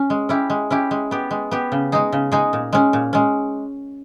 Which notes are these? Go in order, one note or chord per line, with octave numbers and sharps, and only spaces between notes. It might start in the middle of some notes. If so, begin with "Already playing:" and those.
Already playing: C#4
G#3
C#4 E4 G4
G#3
C#4 E4 G4
G#3
B3 G4
G#3
B3 G4
C#3
G#3 D#4 G#4
C#3
G#3 D#4 G#4
A#2
G#3 C#4
A#2
G#3 C#4